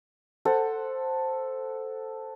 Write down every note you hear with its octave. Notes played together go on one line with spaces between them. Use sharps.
A4 C5 F#5